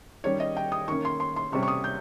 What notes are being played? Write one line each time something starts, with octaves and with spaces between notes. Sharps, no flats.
D#3 G3 C#4 C#5
D#5
G5
D#6
D#3 A#3 C#4 C#6
C6
C6
C6
C3 G3 C#4 C#6
C#6
D#6
G6